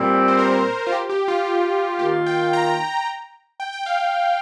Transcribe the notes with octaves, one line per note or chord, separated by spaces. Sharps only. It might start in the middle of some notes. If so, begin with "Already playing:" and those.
Already playing: A#2 G3 C4
C5
A#4
F4
G4
G4
F4
G4
D#3 A#3 F4 G4
G5
A#5
G5
G5
F5